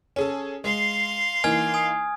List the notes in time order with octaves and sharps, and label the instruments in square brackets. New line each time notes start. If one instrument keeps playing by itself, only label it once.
[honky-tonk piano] C#4 G#4 A4
[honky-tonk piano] G#3 [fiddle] F5 C6
[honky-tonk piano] E3 A#3 D#4 [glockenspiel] G#5 F6 G#6
[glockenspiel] G#5 D#6